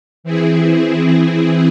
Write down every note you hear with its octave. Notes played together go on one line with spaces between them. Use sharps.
E3 C4 E4 G#4